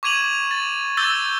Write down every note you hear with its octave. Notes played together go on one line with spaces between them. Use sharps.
C#6 D6 G#6 D#7 F7 F#7
A6
D6 E6 G6 A6 F7 G7